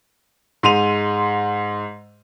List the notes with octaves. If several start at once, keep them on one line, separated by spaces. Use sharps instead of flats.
G#2 C6 D#7 F7